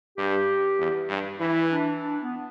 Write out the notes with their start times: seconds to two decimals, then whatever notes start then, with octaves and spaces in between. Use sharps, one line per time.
0.17 G2 G4
0.79 E2
1.09 G2
1.40 E3 E4
1.71 D4
2.01 D4
2.22 B3